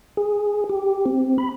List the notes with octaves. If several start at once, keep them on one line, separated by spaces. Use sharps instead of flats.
G#4
G4
C4
B5